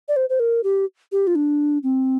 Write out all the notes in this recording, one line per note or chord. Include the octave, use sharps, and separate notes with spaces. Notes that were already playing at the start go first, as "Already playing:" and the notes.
D5
C5
C5
A#4
G4
G4
F4
D4
C4